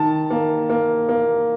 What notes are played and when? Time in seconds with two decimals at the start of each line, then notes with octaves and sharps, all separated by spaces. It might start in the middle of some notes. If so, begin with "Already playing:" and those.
Already playing: D#3 A5
0.30 A#3
0.69 A#3
1.09 A#3